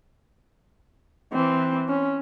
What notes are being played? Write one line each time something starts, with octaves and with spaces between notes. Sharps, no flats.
E3 C4
C#4